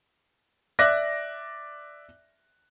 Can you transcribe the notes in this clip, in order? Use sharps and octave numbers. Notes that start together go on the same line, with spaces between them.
D5 E5 D6 F#6 A#6